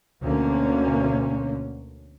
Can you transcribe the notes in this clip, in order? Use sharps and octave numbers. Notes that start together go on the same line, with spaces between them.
D2 B2 D3 A#3 C#4